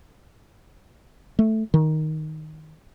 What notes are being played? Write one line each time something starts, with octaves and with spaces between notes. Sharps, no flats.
A3
D#3